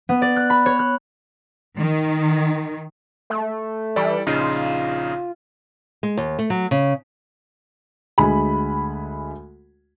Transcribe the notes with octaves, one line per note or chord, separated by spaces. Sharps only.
B3
D5
F#6
B5
C#5
F#6
D#3
A3
E3 G3 A4 D5
A#1 C#3 D#4 F4
G#3
D#2
A3
F#3
C#3
D2 G#3 G#5 B5